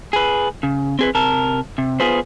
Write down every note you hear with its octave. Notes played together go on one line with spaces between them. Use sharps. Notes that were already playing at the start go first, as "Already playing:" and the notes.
G#4 B4
C#3
C4 G#4 B4
C3 A#4 A5
C3
B3 F4 G#4 B4 C5